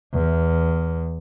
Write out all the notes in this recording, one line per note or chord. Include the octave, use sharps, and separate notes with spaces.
E2